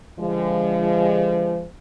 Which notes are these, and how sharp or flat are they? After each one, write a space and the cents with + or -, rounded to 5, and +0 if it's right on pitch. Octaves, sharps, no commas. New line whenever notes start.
D3 -40 F3 -35 G#3 -30